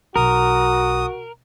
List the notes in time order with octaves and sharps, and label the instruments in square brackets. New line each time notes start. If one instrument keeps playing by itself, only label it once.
[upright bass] B1 [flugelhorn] F#4 [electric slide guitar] A#4 [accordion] D#6